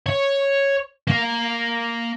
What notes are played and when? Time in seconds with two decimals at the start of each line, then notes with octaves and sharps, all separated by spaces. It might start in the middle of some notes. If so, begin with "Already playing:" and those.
0.06 C#5
1.08 A#3